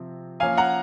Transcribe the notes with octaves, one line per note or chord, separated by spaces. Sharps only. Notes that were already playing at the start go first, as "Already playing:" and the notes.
Already playing: C3 F3 C4
F3 A#3 C#4 F5 G#5
F#5 A#5